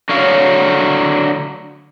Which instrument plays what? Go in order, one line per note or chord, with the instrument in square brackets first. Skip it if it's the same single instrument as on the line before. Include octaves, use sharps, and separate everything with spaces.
[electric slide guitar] D3 F#3 C#5 F5